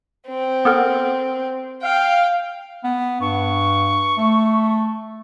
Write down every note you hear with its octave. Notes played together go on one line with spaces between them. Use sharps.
C4
B3 A4 A#4
F5 G5
B3
G2 C#6
A3